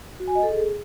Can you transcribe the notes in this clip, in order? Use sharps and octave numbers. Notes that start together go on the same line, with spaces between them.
F#4
G#5
D#5
A4
G#4